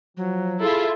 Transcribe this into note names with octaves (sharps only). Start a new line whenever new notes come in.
F3 F#3
E4 F4 G#4 A4 E5